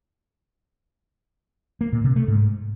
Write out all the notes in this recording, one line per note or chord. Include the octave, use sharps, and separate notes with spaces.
A#3
A#2
C3
A3
G#2